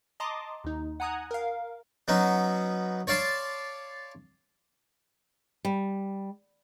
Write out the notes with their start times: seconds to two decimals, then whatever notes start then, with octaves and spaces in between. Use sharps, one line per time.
0.20 D#5 A5 A#5 C6 D6 D#6
0.64 D#2 D#4
1.00 F#5 G#5 A#5 D#6 F#6 G#6
1.31 A#4 F5
2.08 F#3 B3 C#4 D#4
3.07 C#5 D5 F5 A5 C6
5.65 G3